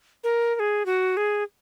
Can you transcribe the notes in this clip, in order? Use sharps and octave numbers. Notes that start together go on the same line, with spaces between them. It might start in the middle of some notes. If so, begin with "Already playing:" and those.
A#4
A#4
G#4
F#4
G#4